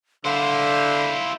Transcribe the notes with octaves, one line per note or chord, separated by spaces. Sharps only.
D3 E4 C5 F5